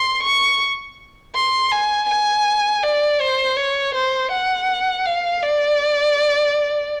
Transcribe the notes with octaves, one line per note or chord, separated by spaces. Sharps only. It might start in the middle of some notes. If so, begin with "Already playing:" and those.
Already playing: C6
C#6
C6
G#5
G#5
D5
C5
C#5
C5
F#5
F5
D5